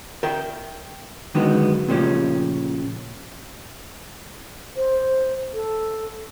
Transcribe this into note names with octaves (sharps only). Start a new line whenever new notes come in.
A#4 E5 G5
D3 D#3 F#3 G#3 B3
A#2 C#3 F3 A3 C#4 G4
C5
A4